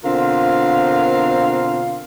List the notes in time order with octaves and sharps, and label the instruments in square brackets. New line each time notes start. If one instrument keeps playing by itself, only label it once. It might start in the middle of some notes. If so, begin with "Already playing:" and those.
[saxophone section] B2 D3 C4 F4 A#4 F5